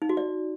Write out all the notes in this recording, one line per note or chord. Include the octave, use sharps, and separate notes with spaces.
D#4
F#4
D5